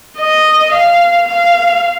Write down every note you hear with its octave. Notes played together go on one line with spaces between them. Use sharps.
D#5
F5
F5